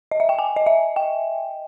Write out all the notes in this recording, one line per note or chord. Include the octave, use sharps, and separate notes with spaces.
D#5
E5
G5
G#5
D#5
E5
G5